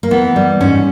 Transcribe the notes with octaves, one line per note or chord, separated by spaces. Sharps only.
A#3
E3 B3
G3
G#2 C#4